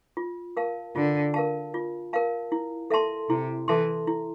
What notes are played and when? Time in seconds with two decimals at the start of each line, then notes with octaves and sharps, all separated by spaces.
0.17 F4
0.57 A#4 F5 A5
0.95 D3 F4
1.34 A#4 F5 A5
1.74 F4
2.13 A#4 F5 A5
2.52 E4
2.90 A4 E5 A5 C6
3.29 C3 E4
3.68 E3 A4 E5 A5 C6
4.07 E4